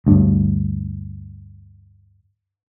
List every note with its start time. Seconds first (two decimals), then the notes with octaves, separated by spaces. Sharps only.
0.06 D2 G2